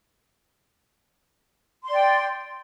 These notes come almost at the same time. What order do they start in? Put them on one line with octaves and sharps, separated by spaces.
C6 D5 G5